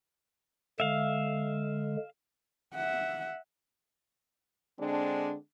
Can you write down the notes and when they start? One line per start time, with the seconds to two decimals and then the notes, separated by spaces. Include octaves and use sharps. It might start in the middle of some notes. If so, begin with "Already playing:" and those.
0.80 D3 G#3 E5 F5
2.74 E5 F#5
4.79 D3 G#3 C4 D4